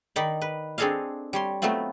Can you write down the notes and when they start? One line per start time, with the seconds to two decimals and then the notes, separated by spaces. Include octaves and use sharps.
0.16 D#3 D#4 D5 B5
0.41 B4
0.78 C4 D4 G#4 A4 D#5 F5
1.33 G3 C#5 C6
1.62 F#3 A3 B3 C4 F4